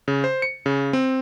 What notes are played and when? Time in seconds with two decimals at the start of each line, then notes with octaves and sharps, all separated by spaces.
0.08 C#3
0.24 C5
0.42 C#7
0.66 C#3
0.93 C4